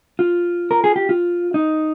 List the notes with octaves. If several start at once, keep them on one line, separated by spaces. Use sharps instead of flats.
F4
A#4
G#4
G4
F4
D#4